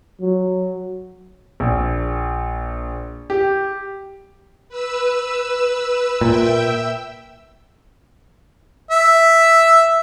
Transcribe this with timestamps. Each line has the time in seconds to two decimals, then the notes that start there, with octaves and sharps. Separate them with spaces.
0.21 F#3
1.60 A#1
3.30 G4
4.69 B4 E6
6.21 A#2 E5 G5 E6
8.91 E5